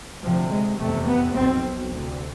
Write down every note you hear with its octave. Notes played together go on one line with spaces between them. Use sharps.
D2 C3 F3
G#3
F1 E2 C3 A3
B3
B1 B2 C4
D2 C3